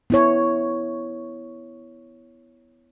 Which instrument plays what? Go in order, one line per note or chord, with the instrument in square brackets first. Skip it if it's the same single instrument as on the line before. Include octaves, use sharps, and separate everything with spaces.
[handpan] B3 E4 C#5